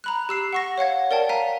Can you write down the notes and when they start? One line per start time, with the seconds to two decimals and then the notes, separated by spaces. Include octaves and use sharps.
0.04 A#5 B5 F#6
0.29 G4 E6 C7
0.53 F#5 C#6 A#6
0.78 C#5 F5 F#5 G#6
1.11 A#4 D5 G5 A5
1.29 F5 A#5 B6 D#7